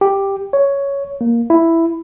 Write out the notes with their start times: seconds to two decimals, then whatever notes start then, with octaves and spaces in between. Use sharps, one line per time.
0.01 G4
0.53 C#5
1.21 A#3
1.50 E4